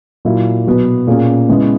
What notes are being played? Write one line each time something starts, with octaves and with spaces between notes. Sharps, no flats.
A#2 F#3 A#3 E4
B2 F#3 B3
A#2 A#3 C#4 G#4
C#3 G#3 B3 E4 G#4